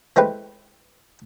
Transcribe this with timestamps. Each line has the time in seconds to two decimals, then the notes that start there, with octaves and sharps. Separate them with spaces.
0.16 E3 G#3 A3 C4 G4 B4